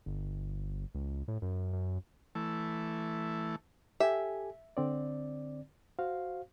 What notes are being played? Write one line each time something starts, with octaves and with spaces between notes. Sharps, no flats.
G1
C#2
A2
F#2
F#2
E3 A3
G4 A4 E5 G#5
D3 C4 D5
F#4 C5 F5